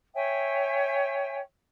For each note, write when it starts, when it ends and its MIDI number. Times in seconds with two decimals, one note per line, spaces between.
0.14 1.38 73
0.14 1.38 76
0.14 1.38 79
0.14 1.38 80